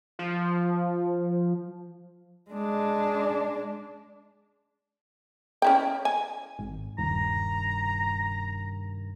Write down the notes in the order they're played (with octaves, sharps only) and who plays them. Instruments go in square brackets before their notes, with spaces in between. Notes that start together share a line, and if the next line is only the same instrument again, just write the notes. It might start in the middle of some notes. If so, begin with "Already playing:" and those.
[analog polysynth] F3
[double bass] G#3 D4
[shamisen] C#4 E4 G5
G#5
[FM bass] G#1
[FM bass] D#1 [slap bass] G2 C3 D#3 [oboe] A#5